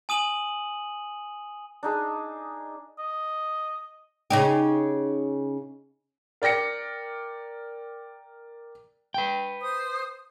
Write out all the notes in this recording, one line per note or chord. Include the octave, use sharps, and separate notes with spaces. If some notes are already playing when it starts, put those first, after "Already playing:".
G#5 D#6 D#7 F#7
D4 D#4 G#4
D#5
C#3 D#4 G4
A#4 D5 G5 A#6 C#7
B4 G5
C5 D#6